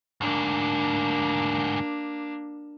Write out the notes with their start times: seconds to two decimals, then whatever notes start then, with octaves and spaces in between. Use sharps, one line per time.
0.21 D2 G#2 A#3 D4